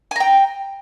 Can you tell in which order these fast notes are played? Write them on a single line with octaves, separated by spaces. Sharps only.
G#5 A#5 G5